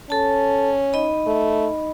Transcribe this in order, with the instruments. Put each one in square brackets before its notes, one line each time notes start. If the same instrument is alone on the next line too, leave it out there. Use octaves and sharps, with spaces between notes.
[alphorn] C#4 [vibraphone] A4 A5
[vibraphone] D#4 D#5 B5
[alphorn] A3